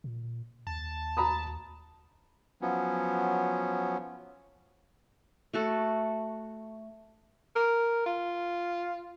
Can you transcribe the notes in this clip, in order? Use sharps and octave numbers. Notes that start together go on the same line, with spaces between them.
A#2
D#2 A5
A#5 B5 D#6
F3 F#3 B3 C#4
A3 F#4 A4
A#4
F4